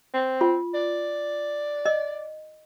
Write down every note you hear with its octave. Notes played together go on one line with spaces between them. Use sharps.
C4
F4
D5
D#5